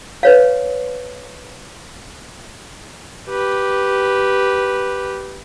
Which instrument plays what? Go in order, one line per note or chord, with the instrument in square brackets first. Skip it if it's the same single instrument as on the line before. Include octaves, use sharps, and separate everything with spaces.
[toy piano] B4 C#5 F5
[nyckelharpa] G4 B4